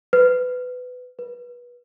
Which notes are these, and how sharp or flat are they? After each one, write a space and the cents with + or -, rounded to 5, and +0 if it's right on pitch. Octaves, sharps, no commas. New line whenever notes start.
B4 +20
B4 -25